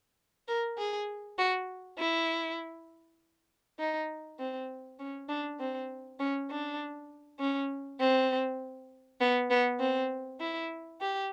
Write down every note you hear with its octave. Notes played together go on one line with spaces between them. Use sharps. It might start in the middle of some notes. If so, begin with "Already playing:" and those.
A#4
G#4
F#4
E4
D#4
C4
C#4
D4
C4
C#4
D4
C#4
C4
B3
B3
C4
E4
G4